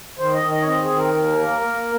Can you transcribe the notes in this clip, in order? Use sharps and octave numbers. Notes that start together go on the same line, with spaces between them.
D#3 C5
D#5
D#3
D#5
C#5
C4 D#5
G#4
D#3
A#4
D#2
A#3
A#3